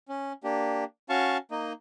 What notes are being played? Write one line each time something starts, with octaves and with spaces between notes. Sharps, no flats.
C#4
A#3 D4 G4
C#4 F#4 F5 A5 C#6
A#3 D#4 D#5